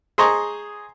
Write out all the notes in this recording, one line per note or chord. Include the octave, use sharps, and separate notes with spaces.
G#4 C5 D#5 A#5 C#6